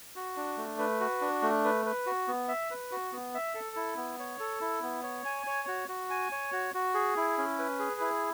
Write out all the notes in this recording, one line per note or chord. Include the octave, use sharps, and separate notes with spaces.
F#4
D4
A3
B4
F#4
D4
A3
B4
B4
F#4
B3
E5
B4
F#4
B3
E5
A4
E4
B3
C#5
A4
E4
B3
C#5
G#5
C#5
F#4
F#4
G#5
C#5
F#4
F#4
G#4
E4
C#4
B4
G#4
E4